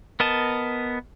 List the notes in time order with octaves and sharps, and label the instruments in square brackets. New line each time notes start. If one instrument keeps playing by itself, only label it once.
[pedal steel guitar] B3 A#4 D#5 A5